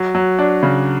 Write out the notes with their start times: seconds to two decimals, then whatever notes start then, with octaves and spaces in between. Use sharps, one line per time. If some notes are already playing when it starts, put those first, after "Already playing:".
Already playing: F#3
0.15 F#3
0.39 D4
0.63 C#3